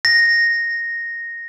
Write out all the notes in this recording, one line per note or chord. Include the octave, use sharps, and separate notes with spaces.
A#6